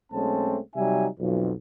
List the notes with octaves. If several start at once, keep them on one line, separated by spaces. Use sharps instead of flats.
B1 G#3 A3 C4 C#4 A5
C3 F#3 G3 D#4 E5 G#5
B1 F2